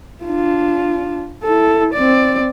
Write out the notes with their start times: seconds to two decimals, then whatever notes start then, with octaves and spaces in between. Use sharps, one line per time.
0.24 D4 F4
1.44 E4 A4
1.94 C4 D5